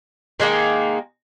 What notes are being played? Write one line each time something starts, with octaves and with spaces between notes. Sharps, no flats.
D#3 G#3 A#3 D#4